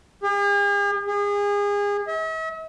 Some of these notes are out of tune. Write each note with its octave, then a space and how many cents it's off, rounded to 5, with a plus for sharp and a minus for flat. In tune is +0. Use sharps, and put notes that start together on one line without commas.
G#4 -45
G#4 -30
E5 -45